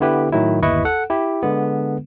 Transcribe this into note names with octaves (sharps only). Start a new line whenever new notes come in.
D3 B3 E4 G4 B4
A2 D#3 F#3 E4
G1 D#2 E4 B4 D#5 C#6
A4 F#5
E4 G4
D3 G#3 B3